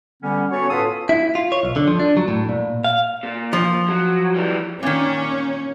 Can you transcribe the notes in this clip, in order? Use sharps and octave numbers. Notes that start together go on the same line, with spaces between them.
D3 G3 B3 C#4
B3 C#4 F#4 A4 C#5
A2 F4 A4 B4 F5 D#6
E4
F4
C#5
B1
D3
F3
D4
F#3
A2
A#2
F5
A#2
F3
F#3
E3 G3
A#2 D#3 C#4